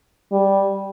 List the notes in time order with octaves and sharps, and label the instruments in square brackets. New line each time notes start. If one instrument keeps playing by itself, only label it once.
[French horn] G3